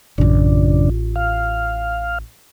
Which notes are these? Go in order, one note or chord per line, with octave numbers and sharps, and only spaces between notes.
A1 F#2 C#3 D4 F4
F5